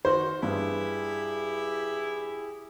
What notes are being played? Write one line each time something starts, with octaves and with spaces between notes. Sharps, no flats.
D#3 F#4 C5
G2 E4 G4 G#4